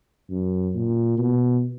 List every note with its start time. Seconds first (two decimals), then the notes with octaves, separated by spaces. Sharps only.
0.30 F#2
0.75 A#2
1.18 B2